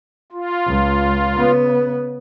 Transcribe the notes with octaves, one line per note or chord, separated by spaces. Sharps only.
F4
C#2
C#3 B3